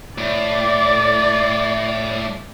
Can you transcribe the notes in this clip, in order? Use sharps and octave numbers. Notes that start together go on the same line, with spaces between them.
A2 D5